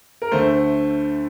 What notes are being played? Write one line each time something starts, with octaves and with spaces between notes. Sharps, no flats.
A#4
D2 D3 A3 C5